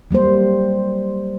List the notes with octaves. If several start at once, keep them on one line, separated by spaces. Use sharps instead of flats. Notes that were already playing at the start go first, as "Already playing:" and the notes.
F#3 G3 A#3 C5